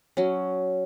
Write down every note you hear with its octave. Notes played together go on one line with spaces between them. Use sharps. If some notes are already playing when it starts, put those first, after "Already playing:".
F#3 C#4